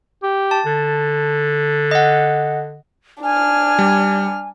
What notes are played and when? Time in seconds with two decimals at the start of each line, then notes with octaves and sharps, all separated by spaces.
0.23 G4
0.51 A5
0.66 D3
1.91 D#5 F#5
3.23 D4 G#5 F6
3.79 G3